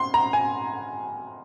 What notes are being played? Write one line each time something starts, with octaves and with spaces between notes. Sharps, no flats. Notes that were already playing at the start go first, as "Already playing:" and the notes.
Already playing: C6
A#5
G#5